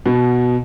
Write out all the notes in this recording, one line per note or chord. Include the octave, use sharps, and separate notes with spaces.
B2